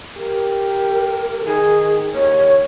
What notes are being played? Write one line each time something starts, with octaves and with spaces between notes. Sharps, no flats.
G4 A#4
D#3 G#4
D#2 C#5